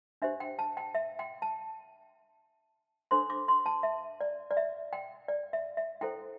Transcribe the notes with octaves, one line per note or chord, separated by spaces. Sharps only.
D4 G4 C5 E5
G5
A5
G5
E5
G5
A5
D4 A4 C5 C6
D6
C6
A5
E5
D5
D5
E5
G5
D5
E5
E5
E4 A4 C5 G5